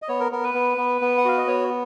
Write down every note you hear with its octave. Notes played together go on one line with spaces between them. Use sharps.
D#5
B3 C#5
A#4
B3 A#4
B4
B3
B3
B3
F#5
F#4 F5
D#5
B3 C#5